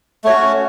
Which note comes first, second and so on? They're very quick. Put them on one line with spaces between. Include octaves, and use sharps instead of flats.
A3 C#5 F#4 C#4